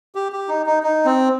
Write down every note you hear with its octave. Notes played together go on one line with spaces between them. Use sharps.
G4
G4
D#4
D#4
D#4
C4